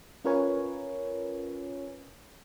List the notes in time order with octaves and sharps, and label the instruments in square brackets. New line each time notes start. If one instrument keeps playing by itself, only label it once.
[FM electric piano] C#4 F4 A#4 B4 C#5 G#5